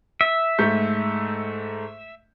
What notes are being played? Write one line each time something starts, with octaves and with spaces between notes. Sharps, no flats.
E5
G#2 A3 G6